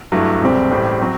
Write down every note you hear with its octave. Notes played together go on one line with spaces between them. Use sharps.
G2 F#3 A3 E4
E1 D2 C3 G3 C4
A1 A2 G3 C4
F#3 C4